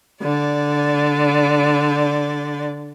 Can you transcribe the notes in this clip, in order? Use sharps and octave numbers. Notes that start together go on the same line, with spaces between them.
D3 D5